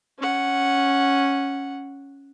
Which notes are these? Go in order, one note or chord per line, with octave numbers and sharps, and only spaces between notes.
C#4 F#5